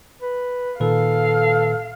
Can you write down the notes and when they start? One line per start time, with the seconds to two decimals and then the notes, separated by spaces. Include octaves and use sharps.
0.22 B4
0.80 A#2 D#3 A4 B4 F5